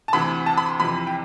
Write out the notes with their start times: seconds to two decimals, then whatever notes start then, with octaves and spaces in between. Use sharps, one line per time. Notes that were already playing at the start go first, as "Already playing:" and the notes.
0.08 A5
0.13 D2 C3 E3 B5
0.46 A5
0.57 B5
0.69 C6
0.80 F2 C3 E3 B5
1.07 G5